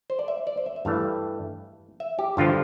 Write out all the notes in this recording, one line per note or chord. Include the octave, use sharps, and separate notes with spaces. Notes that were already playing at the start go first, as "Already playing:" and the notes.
C5
D5
E5
D5
C5
E5
E5
G2 E3 A3 D4 F5
E5
G4
G2 D3 F3 F4